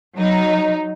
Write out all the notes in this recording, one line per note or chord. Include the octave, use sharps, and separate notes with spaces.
F#3 D#4